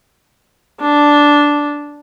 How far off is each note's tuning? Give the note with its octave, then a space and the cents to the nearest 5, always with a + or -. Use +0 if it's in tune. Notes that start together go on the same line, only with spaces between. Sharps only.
D4 -5